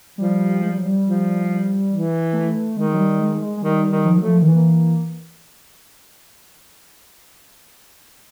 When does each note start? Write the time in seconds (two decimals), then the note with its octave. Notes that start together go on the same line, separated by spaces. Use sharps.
0.18 F3 G3
0.62 G#3
0.70 G3
0.78 F#3
0.85 G3
1.05 F3
1.90 E3
2.33 A3
2.76 D#3 G#3
2.94 F#3
2.99 G3
3.19 G#3
3.41 G#3
3.57 G#3
3.62 D#3 G3
3.91 D#3
4.05 F3
4.17 F#3 A3
4.27 F3
4.42 D#3
4.48 E3 A#3